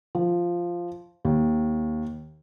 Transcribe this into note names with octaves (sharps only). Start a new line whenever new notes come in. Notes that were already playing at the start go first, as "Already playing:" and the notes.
F3
D#2